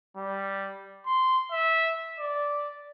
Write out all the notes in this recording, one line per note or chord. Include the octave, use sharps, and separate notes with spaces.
G3
C6
E5
D5